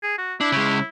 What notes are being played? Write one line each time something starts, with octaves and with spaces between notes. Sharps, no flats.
G#4
F#4
D4 E4
C#3 G#3